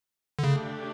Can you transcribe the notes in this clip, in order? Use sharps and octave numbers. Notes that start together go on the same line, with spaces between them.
D3
C#3 A3 D4 G4